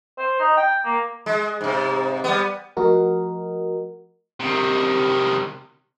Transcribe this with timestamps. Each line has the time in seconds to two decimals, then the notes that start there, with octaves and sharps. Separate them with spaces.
0.18 C5
0.40 D#4
0.57 G5
0.85 A#3
1.26 G#3
1.61 G#2 C3
2.24 G3 B3
2.77 F3 A3 F#4 A#4 D#5
4.40 C3 D#3